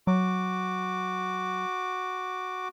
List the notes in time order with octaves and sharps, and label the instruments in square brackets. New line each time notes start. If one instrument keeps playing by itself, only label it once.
[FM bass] F#3 [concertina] F#4 D6